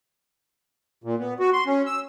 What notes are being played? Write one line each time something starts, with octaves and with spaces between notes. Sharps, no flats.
A#2
B3
F#4
C6
C#4
E6